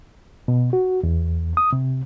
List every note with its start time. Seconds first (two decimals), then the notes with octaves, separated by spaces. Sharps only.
0.48 B2
0.73 F#4
1.04 E2
1.57 D#6
1.73 C3